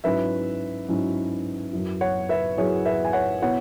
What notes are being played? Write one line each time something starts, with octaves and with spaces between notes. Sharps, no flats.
G#2 F#3 C#4 E4 B4 E5
G#2 F#3 C#4 E4
F#2 F#3 E4
C#5 F#5
B4 E5
F#2 F#3 E4 G#4 C#5
B4 E5
G#5
C#5 F#5
B2 B3 E4 C#5 F#5